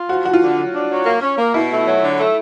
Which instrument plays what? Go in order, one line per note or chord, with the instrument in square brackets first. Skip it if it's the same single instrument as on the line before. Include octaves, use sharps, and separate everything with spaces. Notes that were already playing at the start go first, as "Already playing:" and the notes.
Already playing: [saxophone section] F4
[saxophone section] F3 [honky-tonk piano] F#4
[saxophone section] F3 [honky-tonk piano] F#4
[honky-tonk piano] F4
[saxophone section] D3
F#3
D4
F#3
A#3
C#4
A#3
[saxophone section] B2 [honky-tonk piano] E4
[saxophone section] A3
F#3
D3
A3